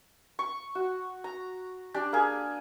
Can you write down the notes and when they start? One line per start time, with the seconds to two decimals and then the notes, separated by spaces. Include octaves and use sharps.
0.39 C#6
0.75 F#4
1.24 A#5
1.94 D4 G4 D5
2.13 A#3 G#4